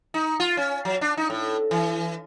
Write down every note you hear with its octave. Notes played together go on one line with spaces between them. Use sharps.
D#4
F4
C#4
F#3
D4
D#4
A2
E3